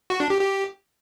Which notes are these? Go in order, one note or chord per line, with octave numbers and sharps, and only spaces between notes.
F#4
D4
G4
G4